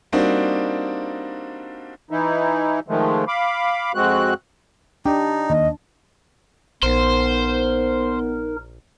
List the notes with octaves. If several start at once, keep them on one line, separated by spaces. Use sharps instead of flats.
G3 A#3 C4 D4 D#4 F#4
E3 D#4 E4
D#3 F3 G#3 A3
F5 B5 D6
F2 G#3 C4 F#4 F#6
D4 D#4 G4
D#2 D#5
A#1 B3 D#4 A#4 C5